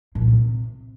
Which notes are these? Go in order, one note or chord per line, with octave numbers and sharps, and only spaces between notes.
A#2
D3
C3